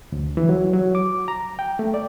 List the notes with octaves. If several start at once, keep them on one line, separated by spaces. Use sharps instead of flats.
D2
E3
F#3
F#3
D6
A#5
G5
A3
D5